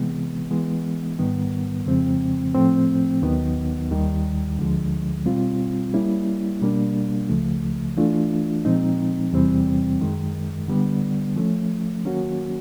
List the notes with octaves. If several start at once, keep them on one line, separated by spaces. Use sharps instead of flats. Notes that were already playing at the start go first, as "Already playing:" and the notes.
Already playing: C3 E3 G#3 B3
E3 G#3 B3
G#2 D#3 G3 B3
F2 C#3 F3 G#3 C4
A2 F3 A3 C4
D#2 D#3 F#3 B3 D#4
D#2 D#3 G3
D2 D3 F3 G#3
B2 G3 C4 F4
G3 A#3 C#4 E4
B2 G3 A#3 D4
C#2 C#3 F3 A3
E3 A3 D4 F4
A#2 F3 G#3 C4 D#4
E2 C3 E3 G3 C4
F#2 D#3 G#3
D3 G3 B3
F3 A3 C#4
D#3 F#3 A#3 C#4 F#4